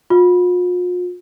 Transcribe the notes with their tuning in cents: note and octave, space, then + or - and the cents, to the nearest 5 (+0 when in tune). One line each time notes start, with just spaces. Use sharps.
F4 +45